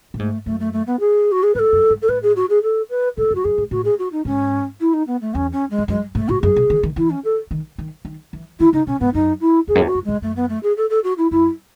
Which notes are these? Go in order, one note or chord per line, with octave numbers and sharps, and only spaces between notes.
A2
G#2 A3
F#2 A3
A3
A3
B3
G#4
F#4
G#4
G#2 B4
A4
F#2
G#2
A4
A2 B4
G#4
F#4
G#4
A4
B4
G#2 A4
F#2
F#4
F#2 G#4
G#2
A2 F#4
G#4
F#4
D#4
G#2 C#4
E4
D#4
B3
A3
E2 C#4
C#4
G#3
G#2
F#2 G#3
G#2 A3
A2 F#4
F#2 G#4
B2
D#3
D#3
E3 E4
C#4
A4
D#3
D#3
D#3
E3
D#3 E4
C#3 D#4
B2 C#4
G#2 B3
F#2 D#4
E4
E2 G#4
F#2
E2
F#4
F#2
G#2 G#3
F#2 A3
B3
A3
G#4
A4
A4
F#4
E4
F#2 E4